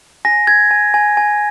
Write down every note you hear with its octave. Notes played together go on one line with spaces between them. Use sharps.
G#5 A#6
G#5 G#6
G#5
G#5
G#5